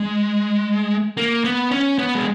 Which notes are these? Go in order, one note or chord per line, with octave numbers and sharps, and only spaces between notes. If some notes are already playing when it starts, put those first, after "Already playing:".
Already playing: G#3
A#3
B3
C#4
B3
G#3